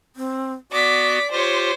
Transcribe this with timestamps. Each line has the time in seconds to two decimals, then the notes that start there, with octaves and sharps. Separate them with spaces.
0.16 C4
0.72 B3 F#4 D5 D6 B6
1.32 F4 G4 C5 C#5